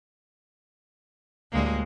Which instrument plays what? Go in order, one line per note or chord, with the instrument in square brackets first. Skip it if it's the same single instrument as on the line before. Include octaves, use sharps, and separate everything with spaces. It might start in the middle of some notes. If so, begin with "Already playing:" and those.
[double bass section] D2 A2 [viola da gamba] G3 G#3 A#3